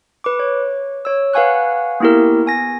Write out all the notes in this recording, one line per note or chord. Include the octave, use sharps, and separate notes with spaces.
B4 D6
C#5
C#5 E6
B4 F5 F#5 G#5 C#6 F#6
A#3 B3 E4 G4 A#4
B3 G#5 A#6